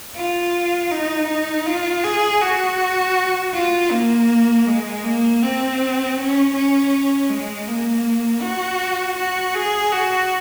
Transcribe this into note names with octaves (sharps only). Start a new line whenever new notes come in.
F4
D#4
D#4
F4
G#4
F#4
F4
A#3
G#3
A#3
C4
C#4
C#4
G#3
A#3
F#4
F#4
G#4
F#4